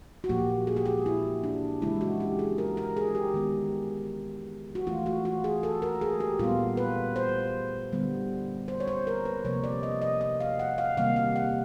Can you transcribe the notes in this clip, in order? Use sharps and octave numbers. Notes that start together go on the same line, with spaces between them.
F#4
A#2 F3 A#3 G4
G#4
G4
G#4
E4
D4
C#3 E3 G#3 E4
F#4
G4
G#4
A#4
A#4
G#4
G4
D#3 G#3 B3
F#4
E3 A3 F4
F#4
F#4
G#4
A4
A#4
G#4
G4
A#2 G3 B3 F4
B4
C5
D3 G3 B3
C5
C#5
C5
A#4
B4
C3 F3 A#3 C#5
D5
D#5
D#5
D#5
F5
F#5
F5
C3 D#3 G3 A#3 F5
F5
F#5